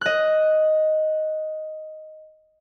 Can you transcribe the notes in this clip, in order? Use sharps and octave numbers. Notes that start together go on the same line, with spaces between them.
D#5 F#6